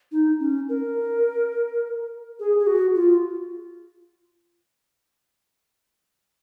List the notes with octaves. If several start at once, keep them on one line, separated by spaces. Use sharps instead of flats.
D#4
C#4
A#4
G#4
G#4
F#4
F4